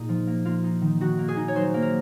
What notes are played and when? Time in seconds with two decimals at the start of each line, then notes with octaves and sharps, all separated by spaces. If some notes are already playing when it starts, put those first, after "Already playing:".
Already playing: A#2 A#3 D#4 G#4
0.09 F3
0.27 A#3
0.45 A#3 F4
0.64 D#4
0.82 D#3
1.00 D#3 F#4
1.18 A#3
1.28 G#4
1.36 D#4
1.48 C#5
1.55 F#3 C5
1.74 A#3
1.82 A#4